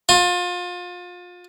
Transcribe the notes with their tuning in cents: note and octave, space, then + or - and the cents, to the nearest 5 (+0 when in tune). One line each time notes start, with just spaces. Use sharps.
F4 +30